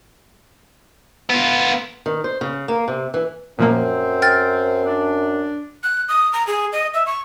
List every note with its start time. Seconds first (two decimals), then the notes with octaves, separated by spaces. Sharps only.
1.29 B3 F4
2.06 D#3
2.24 C5
2.41 C#3
2.68 A#3
2.88 C3
3.14 E3
3.59 F#2 A#2 F3 A#3 C4
4.22 G5 F6 A6
4.86 D4
5.83 F#6
6.09 D#6
6.33 A#5
6.47 G#4
6.73 D#5
6.94 E5
7.06 C#6